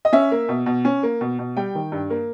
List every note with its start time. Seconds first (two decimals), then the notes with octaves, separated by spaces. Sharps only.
0.05 D#5
0.13 C#4 E5
0.31 A#3
0.49 B2
0.66 B2
0.85 C#4
1.03 A#3
1.21 B2
1.39 B2
1.57 G3 G5
1.75 D#3
1.92 G2
2.10 A#3